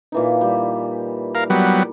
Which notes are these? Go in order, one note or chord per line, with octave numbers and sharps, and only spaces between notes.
A#2 E3 D#4
G3
A#4 F5
F#3 G3 B3